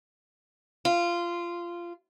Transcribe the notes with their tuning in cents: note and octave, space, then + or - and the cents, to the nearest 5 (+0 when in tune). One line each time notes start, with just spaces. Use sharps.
F4 -15